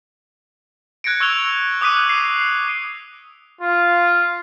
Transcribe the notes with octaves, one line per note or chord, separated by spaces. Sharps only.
F#6 G#6 A#6 C#7 D7
C#6 E6 G#6 F7 G7
D6 D#6 F#6 B6 D#7
C7
F4